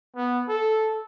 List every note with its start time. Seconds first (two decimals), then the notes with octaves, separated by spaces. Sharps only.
0.16 B3
0.49 A4